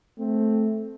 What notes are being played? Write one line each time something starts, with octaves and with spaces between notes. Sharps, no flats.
A3 C4